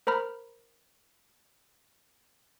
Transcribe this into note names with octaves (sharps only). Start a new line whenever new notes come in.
A#4 C5 A#5 B5 F6